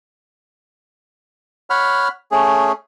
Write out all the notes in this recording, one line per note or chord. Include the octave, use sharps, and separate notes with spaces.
C#5 F#5 B5 F6
A3 C#4 G#4